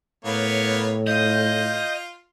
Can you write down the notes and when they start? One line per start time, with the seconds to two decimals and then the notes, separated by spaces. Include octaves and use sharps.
0.25 A2 A#3 B3 C#5
1.07 F4 D#5 G6